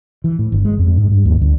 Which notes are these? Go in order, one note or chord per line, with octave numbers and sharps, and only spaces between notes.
E3
A2
G1
G#3
F2
G#2
G2
D#2
D2